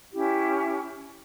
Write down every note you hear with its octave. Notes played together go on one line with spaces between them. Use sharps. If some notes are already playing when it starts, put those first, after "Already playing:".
C#4 E4 G4